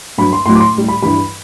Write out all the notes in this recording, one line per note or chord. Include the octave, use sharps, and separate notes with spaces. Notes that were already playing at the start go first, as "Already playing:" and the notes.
G2 F#3 B5
C6
A2 F#3 C6
D6
C6
A2 G3
B5
G2 E3 G3 B5